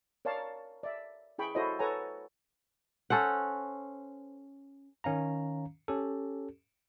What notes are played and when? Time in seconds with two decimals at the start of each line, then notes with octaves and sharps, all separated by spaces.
0.25 A#4 C#5 D5 F5 A5
0.83 D5 E5
1.38 E4 G#4 G5 B5 C#6
1.55 E4 F#4 A4 C5 C#5 D#5
1.79 A4 B4 C#5 F#5 G#5 A#5
3.10 C#4 A4 C5 F#5
5.04 D#3 C#4 F5 A#5
5.88 C#4 G4 A4